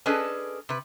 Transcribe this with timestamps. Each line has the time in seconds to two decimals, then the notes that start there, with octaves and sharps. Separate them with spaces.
0.06 C#4 D4 G#4 A4 B4 D#5
0.69 C3 B4